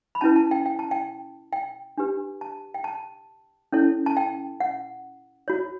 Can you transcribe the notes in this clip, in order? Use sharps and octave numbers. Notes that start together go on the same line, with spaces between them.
B5
C#4 E4 B4 A5
A5
G5
G5
A5
G5
G5
D4 G4 B4
A5
G5
A5
C#4 E4 A4 C#5
A5
G5
F#5
F#4 C#5